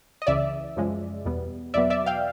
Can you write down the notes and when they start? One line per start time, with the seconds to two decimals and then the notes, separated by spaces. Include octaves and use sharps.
0.22 D#5
0.27 C#2 C#3 E3 D5 E5
0.76 F#2 C#3 F3 G#3
1.25 E2 B2 G3 B3
1.74 E2 B2 F#3 B3 D5 E5
1.90 D5 E5
2.06 F5 G5